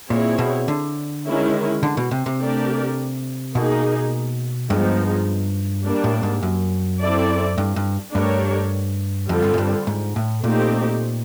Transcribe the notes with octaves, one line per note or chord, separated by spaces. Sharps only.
A#2 C4 E4 G#4 C#5
B2
D3
D#3 G#3 C#4 E4
D3
B2
C3
C3
A3 D4 G4 A#4 D5
B2 A#3 D#4 G#4
G2 F3 G#3 B3 D#4
G3 A#3 D4
A2
G#2
F#2
C4 E4 A4 D5
G2
G2
G2 A3 D4 G4 A#4 C#5
F2 D3 G3 C4 F4 A4
G2
G#2
G2
G#2
A2
A#2 A3 C4 D#4 G4